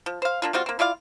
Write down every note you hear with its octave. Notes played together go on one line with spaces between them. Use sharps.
F3
C5 F5
A#3 D4 F4
G3 C4 F4 F#4
A#3 C4
E4 F4 D5 F5